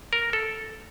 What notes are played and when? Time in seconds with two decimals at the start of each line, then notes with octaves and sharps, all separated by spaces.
0.13 A#4
0.33 A4